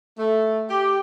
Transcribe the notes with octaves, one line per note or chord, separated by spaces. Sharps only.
A3
G4